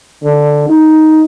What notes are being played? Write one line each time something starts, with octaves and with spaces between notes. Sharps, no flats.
D3
D#4